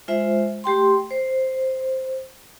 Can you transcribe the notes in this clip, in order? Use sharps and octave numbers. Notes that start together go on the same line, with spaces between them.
G#3 F4 C5 E5
A3 G4 G5 C6
C5